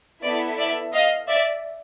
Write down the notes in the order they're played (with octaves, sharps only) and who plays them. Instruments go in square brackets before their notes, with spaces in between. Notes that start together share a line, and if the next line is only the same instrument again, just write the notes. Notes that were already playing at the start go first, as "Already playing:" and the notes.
[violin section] B3 E4 A4 D5
D5 E5
D#5 F5
D5 E5